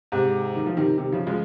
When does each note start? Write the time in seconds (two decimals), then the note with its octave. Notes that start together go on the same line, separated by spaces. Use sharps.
0.12 G#2 C3
0.55 D#3
0.66 F3
0.77 C3 D#3
0.98 C3 D#3
1.12 C#3 F3
1.27 F3 G#3